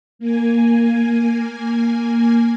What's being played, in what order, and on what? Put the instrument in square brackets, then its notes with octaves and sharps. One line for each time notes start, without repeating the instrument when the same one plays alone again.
[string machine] A#3 G#5